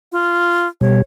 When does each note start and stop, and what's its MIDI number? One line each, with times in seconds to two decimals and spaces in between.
0.12 0.68 65
0.81 1.02 47
0.81 1.02 55
0.81 1.00 73